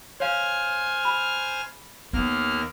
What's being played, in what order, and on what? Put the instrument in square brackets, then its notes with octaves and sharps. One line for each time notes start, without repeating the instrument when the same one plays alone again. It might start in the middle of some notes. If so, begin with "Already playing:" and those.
[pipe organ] C5 G#5 F6 [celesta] C#5 F5
[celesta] B5
[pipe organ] D#2 A#3 F6 [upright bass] B3